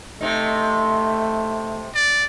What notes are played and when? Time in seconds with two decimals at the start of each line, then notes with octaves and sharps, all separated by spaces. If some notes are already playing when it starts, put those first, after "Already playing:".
0.21 C3 A3 D#4
1.95 D5